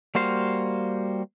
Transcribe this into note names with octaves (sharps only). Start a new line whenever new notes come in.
G3 A#3 F#4 C5 F5